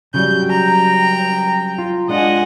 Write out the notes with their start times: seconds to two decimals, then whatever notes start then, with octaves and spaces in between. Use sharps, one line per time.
0.14 C#3 F#3 G3 G6
0.46 G5 A#5
1.78 F4
2.09 G#3 D4 F4 D#5 F#5 G#5